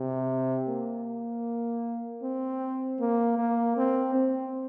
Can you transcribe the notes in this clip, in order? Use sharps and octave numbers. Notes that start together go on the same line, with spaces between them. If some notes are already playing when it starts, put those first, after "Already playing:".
Already playing: C3
A#3
C4
A#3
A#3
C4
C4